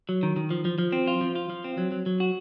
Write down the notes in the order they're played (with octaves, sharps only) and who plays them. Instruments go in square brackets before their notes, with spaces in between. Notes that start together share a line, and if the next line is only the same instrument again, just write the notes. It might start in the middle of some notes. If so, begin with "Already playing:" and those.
[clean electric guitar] F#3
D#3
D#3
F3
F3
F3
C4
F4
F3
F4
F3
C4
F#3
F#3
F#3
F#4